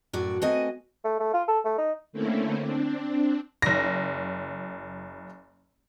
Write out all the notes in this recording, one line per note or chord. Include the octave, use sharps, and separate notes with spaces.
F#2 A2 F#4 D5
A3 C4 F#4 B4 D#5 G#5
A3
A3
F4
A4
A3
D#4
D3 A3 A#3 C4 C#4 E4
C4 D4
F#1 A#6